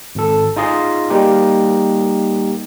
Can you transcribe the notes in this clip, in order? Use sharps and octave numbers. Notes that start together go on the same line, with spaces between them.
G#1 A4
D#4 F4 G#4 D#5 C6
G3 A#3 D#4 G4